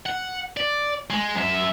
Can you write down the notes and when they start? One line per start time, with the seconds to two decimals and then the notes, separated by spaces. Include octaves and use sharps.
0.06 F#5
0.57 D5
1.10 G#3
1.36 F#2 E5